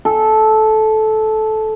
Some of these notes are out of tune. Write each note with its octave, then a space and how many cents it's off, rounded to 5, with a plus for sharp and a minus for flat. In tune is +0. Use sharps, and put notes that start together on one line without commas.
A4 -15